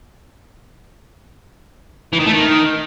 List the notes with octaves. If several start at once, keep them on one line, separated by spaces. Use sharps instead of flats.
E3
D#3
A3
D#3